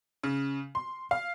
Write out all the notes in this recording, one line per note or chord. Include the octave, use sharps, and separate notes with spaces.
C#3
C6
F5